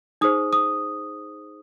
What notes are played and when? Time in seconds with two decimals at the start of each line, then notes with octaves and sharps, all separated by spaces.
0.21 D#4 G#4 C5 D#6
0.53 D#6